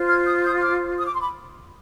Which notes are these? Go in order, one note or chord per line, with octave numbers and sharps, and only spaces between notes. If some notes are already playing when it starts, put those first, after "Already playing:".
Already playing: F4 C5
F6 G#6
D#6 G6
D#6 G6
D6 F6
D#6
D6
C6
B5 D6